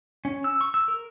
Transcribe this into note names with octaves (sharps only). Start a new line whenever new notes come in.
C#4
E6
C#6
E6
A#4